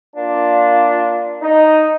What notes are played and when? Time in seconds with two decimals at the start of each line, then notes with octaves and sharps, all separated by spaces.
0.16 A#3 D4 F4
1.42 D#4